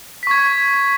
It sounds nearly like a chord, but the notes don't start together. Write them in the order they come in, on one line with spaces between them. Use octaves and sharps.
B6 C#6 G#6